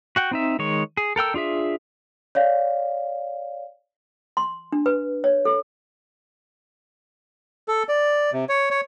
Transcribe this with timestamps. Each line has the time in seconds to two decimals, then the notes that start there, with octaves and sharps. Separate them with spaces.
0.16 F#4 F#5 G5
0.31 C4 D#4 E5
0.59 D#3 G#3 C#5
0.97 G#4
1.16 A4 A#4 G5 E6
1.34 D4 F4 G#4 E5
2.35 C#5 D5 F5
4.37 C6
4.72 D4
4.86 B4
5.24 C#5
5.45 A4
7.68 A4
7.89 D5
8.33 C3
8.49 C#5
8.71 C#5